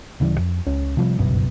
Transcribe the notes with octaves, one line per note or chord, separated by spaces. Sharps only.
D1 C#3 E3 G3
F2
C#2 C#4
C3 F3 G3
G1 C#2 F#2 B2